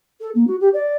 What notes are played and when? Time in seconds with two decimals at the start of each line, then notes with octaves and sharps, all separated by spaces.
0.20 A4
0.34 A#3
0.47 F#4
0.60 G4
0.73 D5